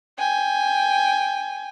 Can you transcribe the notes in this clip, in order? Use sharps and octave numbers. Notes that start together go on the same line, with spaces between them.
G5 G#5